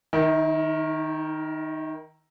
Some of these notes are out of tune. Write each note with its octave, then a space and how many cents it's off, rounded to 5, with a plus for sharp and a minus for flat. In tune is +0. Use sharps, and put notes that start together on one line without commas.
D#3 +0 E4 -45